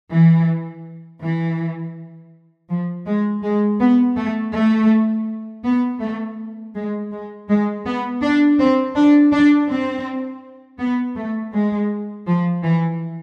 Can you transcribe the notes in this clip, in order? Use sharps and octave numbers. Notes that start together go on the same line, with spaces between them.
E3
E3
F3
G#3
G#3
B3
A3
A3
B3
A3
G#3
G#3
G#3
B3
D4
C4
D4
D4
C4
B3
A3
G#3
F3
E3